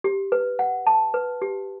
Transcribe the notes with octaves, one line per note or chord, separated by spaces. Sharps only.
G4
B4
F#5
A5
B4
G4